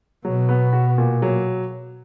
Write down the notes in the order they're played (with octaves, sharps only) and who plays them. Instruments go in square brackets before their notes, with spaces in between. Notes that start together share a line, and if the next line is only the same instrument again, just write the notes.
[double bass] B2 [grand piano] F#3
[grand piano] B3
F#4
A#2
F#3